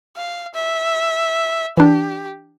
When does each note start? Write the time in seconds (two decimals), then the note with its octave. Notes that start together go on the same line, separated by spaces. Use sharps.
0.16 F5
0.54 E5
1.77 E3 D4 G4